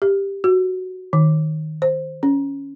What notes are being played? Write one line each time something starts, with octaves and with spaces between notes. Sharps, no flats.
G4
F#4
D#3
C5
C#4